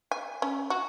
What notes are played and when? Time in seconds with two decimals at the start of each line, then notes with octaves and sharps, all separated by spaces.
0.11 G#5
0.42 C#4
0.70 F#4